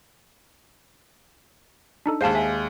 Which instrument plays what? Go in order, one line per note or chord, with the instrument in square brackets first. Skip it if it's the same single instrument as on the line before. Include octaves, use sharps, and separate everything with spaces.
[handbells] D4 D#4 A4
[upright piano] D#2 G#3 [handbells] C5 F5 A5
[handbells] E5 G#5